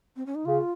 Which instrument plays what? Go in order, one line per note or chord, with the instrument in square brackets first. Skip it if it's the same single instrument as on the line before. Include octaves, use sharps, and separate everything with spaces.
[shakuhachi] C4
C#4
D#4
[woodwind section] C#3 [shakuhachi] F4